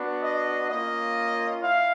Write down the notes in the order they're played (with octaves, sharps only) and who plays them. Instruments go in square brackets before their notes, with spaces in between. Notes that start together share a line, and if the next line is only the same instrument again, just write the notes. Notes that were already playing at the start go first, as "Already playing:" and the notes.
Already playing: [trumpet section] B3 D4 F#4
D#5
A#3 C#4 F4 D#5
E4 F5